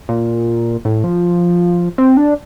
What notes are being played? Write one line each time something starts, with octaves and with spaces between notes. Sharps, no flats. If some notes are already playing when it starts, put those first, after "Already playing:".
A#2
A2
F3
C4
D4